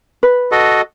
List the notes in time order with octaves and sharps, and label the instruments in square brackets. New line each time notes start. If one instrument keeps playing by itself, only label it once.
[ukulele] B4
[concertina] F#4 A4 D#5